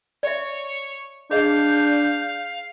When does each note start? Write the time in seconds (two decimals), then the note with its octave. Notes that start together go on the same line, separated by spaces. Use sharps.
0.23 C#5 D5 E5
1.31 D4 G#4 D#5 F5 G6